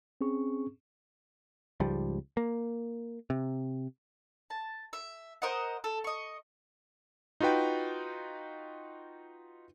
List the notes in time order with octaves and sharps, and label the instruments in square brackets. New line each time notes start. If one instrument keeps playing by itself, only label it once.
[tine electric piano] C4 C#4 G#4 C#6
[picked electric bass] C#2 G#2 F3 G3
A#3
C3
[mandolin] A5
E5
A#4 C5 D#5 F#5
A4
D#5 C#6
[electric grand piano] D#4 F4 F#4 B4 G5